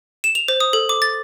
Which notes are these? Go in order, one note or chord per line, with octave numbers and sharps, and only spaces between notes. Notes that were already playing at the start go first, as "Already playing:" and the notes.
E7
F7
C5
D#6
A4
D6
A6